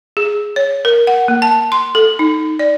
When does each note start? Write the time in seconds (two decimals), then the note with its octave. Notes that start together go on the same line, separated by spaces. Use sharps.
0.17 G#4
0.56 C#5
0.85 A#4
1.07 F#5
1.28 A#3
1.42 A5
1.72 C6
1.95 A4
2.19 D#4
2.59 D5